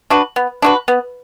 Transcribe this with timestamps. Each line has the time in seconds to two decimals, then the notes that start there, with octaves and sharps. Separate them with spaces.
0.10 D4 F#4 B4
0.36 B3
0.62 D4 F#4 B4
0.88 B3